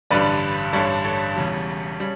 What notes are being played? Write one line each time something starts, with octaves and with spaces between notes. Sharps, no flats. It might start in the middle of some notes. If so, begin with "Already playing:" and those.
A1 G2 D3 G3 B4 D5
A1 G2 D3 G3 A4 C#5
A4 C#5
E1 E2 C#3 G3
C#3 G3